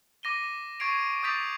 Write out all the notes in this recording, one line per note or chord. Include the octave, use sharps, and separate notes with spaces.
D6 A#6 D#7 G7
E7
C#6 G#6 A6 C7 D7 F7
D6 D#6 G6 A6 B6 F7